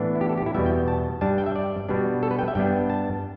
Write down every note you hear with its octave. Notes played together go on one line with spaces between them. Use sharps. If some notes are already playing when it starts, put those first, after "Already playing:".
Already playing: A2 E3 B3 D4
E4
G4
A4
G4
E4
E2 B2 G3 B3 E5
G5
A5
G2 G3 D4 A5
G5
E5
D5
B2 G3 B3 D4
A4
B4
G5
E5
G2 G3 B3 D4 G5
A5